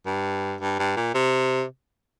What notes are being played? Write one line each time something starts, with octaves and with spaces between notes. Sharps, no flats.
G2
G2
G2
A#2
C3